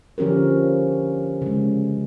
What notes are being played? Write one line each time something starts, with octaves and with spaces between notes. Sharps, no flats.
D3 F3 C#4 G4 A#4
C#3 G#3